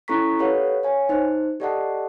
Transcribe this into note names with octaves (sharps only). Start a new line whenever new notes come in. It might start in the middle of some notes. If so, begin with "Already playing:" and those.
C#4 E4 A4 A#5 C#6 B6
G4 A4 B4 C#5 F5 F#5
C#5 F5 G#5
D#4 C5
G4 A4 D5 D#5 F#5 A5